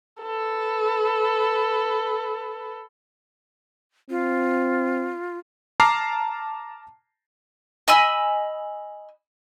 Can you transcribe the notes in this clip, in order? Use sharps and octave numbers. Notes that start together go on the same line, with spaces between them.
A4 B4
C4 F4
A5 A#5 D6 F6 C7
D#5 G#5 B5 E6